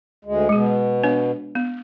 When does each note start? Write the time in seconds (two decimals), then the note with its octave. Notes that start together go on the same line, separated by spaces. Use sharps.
0.25 D2 G#3
0.49 B2 G#3 G#4
1.04 B3 D4 C#5
1.55 B3